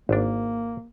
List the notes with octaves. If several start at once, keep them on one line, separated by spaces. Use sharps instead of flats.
G#1 A#3 D4